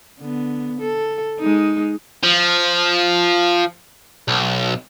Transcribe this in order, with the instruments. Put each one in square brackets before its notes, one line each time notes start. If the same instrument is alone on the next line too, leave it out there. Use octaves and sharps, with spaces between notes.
[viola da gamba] D3 B3
A4
G#3 D#4
[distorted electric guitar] F3
B1